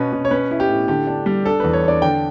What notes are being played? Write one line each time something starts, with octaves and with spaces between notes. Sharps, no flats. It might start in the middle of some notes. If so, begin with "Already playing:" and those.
Already playing: B2 C#4 B4
B2
C#5
C#4 B4
E4
G4
A2
D3 G4
D4
G3
D4 A4
E2 B4
C#5
D4 D5
D3 G5